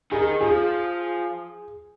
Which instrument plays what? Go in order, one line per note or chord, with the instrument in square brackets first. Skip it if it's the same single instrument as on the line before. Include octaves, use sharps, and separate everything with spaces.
[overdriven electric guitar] D#3 [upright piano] G#4
[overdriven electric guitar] F3 [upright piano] G#4